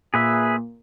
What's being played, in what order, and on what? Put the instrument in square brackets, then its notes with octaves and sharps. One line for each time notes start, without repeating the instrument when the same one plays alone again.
[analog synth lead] A#2 [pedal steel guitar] G#4 B4 E5